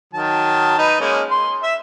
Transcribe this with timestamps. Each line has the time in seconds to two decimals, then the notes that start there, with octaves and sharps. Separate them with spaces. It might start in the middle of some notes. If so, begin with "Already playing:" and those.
0.14 D#3 F#3 A5
0.78 D#4 B4
1.00 G#3 A#3 C#4
1.31 C6
1.63 E5